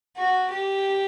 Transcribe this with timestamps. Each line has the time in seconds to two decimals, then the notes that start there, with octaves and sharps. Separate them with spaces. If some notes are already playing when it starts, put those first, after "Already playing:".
0.16 F#4
0.50 G4